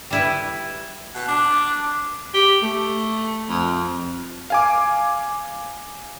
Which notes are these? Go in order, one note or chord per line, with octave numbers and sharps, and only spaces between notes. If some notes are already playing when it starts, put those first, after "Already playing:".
G3 E4 B4
B2 F#6
D4 D6
G4
A3
F2
F5 G#5 D6